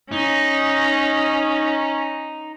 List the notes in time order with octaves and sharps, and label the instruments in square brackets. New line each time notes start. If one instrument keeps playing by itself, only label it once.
[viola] C#4 [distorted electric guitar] D#4